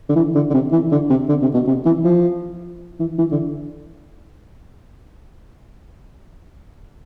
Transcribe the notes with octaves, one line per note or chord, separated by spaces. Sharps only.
D3
E3
D3
D3
C3
E3
D3
C3
D3
C3
B2
C3
E3
F3
E3
E3
D3